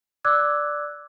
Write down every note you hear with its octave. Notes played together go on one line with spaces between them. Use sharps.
D5 D6 E6 F#6 G#6